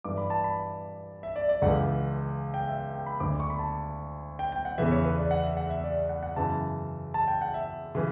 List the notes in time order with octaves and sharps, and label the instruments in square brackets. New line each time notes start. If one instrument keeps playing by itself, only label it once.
[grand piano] G2 E3 D6
B5
A5
B5
E5
D5
D5
C#2 C#3 E3 F#5
G5
E5
G5
B5
D2 D3 D6
C#6
B5
A5
G5
G5
F#5
E2 C#3 E3 E5
C#5
B4
D5
F#5
E5
F#5
E5
D5
E5
F#5
F#5
F#2 C#3 E3 A5
A5
G5
F#5
E5
C#3 E3